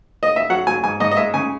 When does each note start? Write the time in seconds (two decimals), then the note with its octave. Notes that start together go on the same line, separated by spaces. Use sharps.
0.23 D#5
0.36 E5
0.50 F#3 F#5
0.67 F#3 G#5
0.84 G#2 G#5
1.00 G#2 D#5
1.12 D#5
1.17 G#3 E5
1.34 C#3 G#5